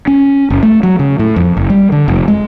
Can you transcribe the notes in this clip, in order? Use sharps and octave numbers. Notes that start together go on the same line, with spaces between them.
C#4
F#1
A3
F#3
C#3
A2
F2
F#1
G3
D3
F1
G#3